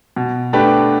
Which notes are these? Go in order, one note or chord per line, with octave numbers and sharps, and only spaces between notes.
B2
A3 D4 G4 B4